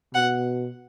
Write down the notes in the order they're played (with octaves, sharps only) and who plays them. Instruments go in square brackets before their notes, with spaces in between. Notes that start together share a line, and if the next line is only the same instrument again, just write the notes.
[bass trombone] B2 [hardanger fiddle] F#5